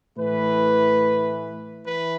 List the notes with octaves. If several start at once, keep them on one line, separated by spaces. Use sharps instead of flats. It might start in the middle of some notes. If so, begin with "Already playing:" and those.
A2 E3 B4
E3 B4